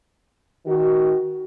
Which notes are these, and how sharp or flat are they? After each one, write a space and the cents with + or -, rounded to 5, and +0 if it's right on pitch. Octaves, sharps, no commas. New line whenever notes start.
D#3 +20 F#4 +15